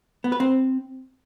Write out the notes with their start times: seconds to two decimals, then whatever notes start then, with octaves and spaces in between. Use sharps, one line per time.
0.24 B3
0.32 B4
0.40 C4